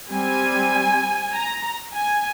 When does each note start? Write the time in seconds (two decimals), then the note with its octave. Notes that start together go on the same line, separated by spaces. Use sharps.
0.12 G3 C4 G#5
1.35 A#5
1.96 G#5